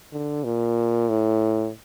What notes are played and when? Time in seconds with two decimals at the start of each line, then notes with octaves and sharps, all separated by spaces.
0.13 D3
0.44 A#2
1.09 A2